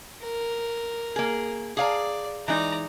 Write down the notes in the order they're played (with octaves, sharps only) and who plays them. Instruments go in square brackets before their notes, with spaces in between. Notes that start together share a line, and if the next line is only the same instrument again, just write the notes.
[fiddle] A#4
[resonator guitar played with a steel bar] A#3 G#4
[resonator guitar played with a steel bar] G#4 F5 A#5 [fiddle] D5
[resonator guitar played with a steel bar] E3 G#3 D#4 [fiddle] D5 A#5